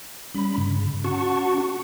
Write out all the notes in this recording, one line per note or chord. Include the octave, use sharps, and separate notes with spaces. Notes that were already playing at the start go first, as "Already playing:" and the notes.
G3 C#4 B5
G2 C#3
C#4 F#4 F#5 A5 C#6